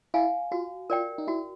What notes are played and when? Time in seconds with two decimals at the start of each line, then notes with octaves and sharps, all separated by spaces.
0.14 E4 F5 G#5
0.52 F4 F#4
0.90 F4 A#4 D5 G5
1.18 D#4
1.27 E4 F#4